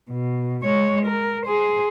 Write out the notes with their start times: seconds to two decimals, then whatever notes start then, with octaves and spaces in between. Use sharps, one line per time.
0.10 B2
0.64 G#3 C#5
1.06 A#4
1.46 G#4 C5